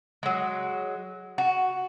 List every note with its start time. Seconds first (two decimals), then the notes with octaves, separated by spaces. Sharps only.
0.23 F#3 G#3
1.38 F#4